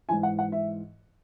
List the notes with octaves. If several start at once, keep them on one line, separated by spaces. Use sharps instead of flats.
G#2 E3 G#5
F#5
F#5
E5